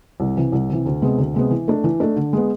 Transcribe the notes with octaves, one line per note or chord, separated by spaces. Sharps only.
C2
C3 E3
C2
C3 E3
D2
C3 G#3 B3
D2
C3 G#3 B3
E3
A3 D4
E3
A3 D4
D3
G#3 B3